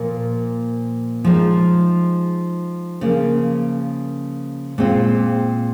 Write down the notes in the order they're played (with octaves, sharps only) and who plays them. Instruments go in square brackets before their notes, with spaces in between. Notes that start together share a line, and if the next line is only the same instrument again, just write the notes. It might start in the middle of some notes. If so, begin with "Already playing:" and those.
Already playing: [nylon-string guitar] A#2 F3 A#3
F3 G#3 D#4
C#3 F3 A#3
A#2 G#3 C4 F4